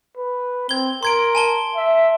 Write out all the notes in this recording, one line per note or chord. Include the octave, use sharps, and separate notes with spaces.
B4
C4 G#6 G7
A#4 C6 G#6 D7
G#5 A5 G7
E5